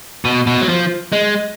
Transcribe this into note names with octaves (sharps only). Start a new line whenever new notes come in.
B2
B2
F#3
F3
G#3